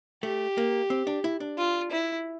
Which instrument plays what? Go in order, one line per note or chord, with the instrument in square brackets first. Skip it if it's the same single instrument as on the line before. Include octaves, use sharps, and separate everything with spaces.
[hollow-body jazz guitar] A3 [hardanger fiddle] G4
[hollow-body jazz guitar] A#3
C4
D4
E4
D4
[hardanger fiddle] F4
E4